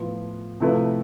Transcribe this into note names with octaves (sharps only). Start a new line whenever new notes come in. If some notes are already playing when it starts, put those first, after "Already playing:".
Already playing: A2 F3 B3 F4
C3 F3 A3 E4 B4